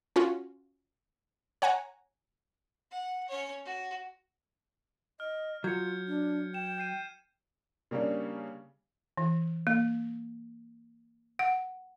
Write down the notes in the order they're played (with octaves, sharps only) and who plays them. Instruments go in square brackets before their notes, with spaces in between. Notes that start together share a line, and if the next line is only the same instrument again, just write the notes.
[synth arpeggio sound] C#4 F4 F#4
C#5 F#5 G#5 A#5
[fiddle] F#5
C#4 C#5
F#4
[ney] D#5 [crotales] F6
[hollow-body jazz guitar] F#3 [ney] F4 [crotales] G6 G#6 C#7
[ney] D4
[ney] G5 [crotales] E7
[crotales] G6 C7 D#7
[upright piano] C#3 G3 A#3 C#4 D4
[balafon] E3
A#3
F#5